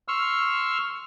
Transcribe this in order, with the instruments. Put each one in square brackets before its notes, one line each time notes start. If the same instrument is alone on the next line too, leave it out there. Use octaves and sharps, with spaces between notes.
[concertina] C6 C#6 E6 F6